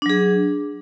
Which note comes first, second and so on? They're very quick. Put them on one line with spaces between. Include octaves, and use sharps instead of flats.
D4 F#3 G#4